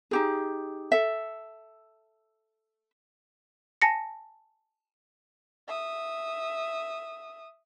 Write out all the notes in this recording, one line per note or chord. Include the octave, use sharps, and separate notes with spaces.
D#4 G4 G#4
A4 E5
G#5 A5 A#6 C#7
E5 D#6